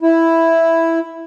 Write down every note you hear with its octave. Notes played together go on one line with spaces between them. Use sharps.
E4